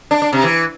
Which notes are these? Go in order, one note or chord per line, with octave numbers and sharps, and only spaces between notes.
D4
D4
C3
E3